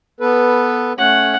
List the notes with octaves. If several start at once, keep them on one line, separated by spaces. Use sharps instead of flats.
B3 A4 B4
A3 C#4 C#5 F#5